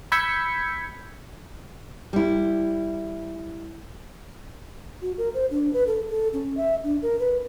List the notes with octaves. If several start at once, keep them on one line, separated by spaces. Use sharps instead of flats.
B5 E6 G6 G#6 B6 C#7
G3 E4
F#4
A#4
C5
D4
B4
A4
A4
C#4
E5
D4
A#4
B4